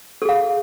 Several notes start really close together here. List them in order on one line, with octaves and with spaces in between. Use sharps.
A4 G#4 F5